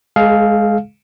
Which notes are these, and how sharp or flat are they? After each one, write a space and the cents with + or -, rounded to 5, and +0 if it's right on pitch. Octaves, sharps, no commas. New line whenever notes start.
G#3 +0 G#4 +40 F5 +0